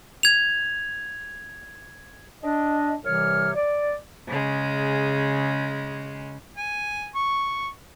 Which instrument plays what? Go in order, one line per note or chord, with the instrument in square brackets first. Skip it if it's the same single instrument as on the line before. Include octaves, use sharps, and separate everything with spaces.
[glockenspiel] G#6 F7
[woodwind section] D4 D#5
C2 C3 E3 G3 C#5 F6
D5
[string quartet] C#3 G#3
[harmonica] G#5
C#6